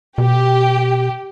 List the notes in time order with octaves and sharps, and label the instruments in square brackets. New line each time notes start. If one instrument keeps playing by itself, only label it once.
[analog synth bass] B2 [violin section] G4